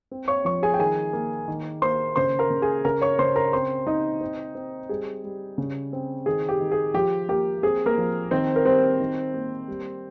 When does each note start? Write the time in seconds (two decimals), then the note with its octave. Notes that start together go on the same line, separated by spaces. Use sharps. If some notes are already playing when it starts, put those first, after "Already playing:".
0.11 C4
0.28 C#5 C#6
0.45 F3 C#5 C#6
0.63 G#4 G#5
0.74 G5
0.79 D#3 G#4 G#5
1.13 A#3
1.48 D#3
1.82 A#3 C5 C6
2.16 C#3 C5 C6
2.39 A#4 A#5
2.50 C#3
2.62 G#4 G#5
2.85 C#3 A#4 A#5
3.02 C#5 C#6
3.19 C#3 C5 C6
3.36 A#4 A#5
3.53 C4 C5 C6
3.87 C4 D#4 D#5
4.21 C4
4.55 C4
4.89 G3 G#4
5.24 G3
5.58 C#3
5.93 C4
6.26 D#3 G#4
6.49 G4
6.60 D#3
6.71 G#4
6.94 F3 G4
7.29 A#3 G4
7.63 C4 G#4
7.86 A#3 A#4
7.98 F3
8.31 D#3 C4 C5
8.56 A#4
8.65 G3 C4 C5
9.00 D#3
9.34 A#3
9.68 G3